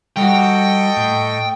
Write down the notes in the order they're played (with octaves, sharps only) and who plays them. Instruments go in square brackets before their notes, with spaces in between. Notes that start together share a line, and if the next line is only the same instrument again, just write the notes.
[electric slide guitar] G3 F#4 [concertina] A4 D#5 C#6 [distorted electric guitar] G5
[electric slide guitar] A2